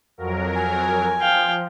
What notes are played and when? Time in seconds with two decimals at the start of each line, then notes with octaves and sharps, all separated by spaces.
0.18 F2 F#3 A#4
0.56 G#5
1.21 F3 F5 G5